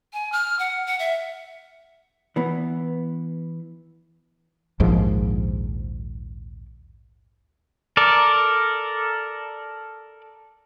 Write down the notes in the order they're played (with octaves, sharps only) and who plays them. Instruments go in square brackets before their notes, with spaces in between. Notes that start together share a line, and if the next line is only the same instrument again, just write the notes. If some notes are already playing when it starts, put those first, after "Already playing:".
[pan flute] G#5
F6
F#5
F#5
E5
[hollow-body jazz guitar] E3 B3
[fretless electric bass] A#1 D#2 G#2 F3
[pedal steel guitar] A4 A#4 D5